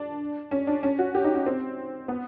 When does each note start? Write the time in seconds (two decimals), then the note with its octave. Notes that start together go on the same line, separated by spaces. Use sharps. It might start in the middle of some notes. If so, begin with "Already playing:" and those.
Already playing: D4
0.51 C#4
0.67 D4
0.83 C#4
0.99 F#4
1.15 G4
1.24 D#4
1.35 C#4
1.46 C4
2.08 B3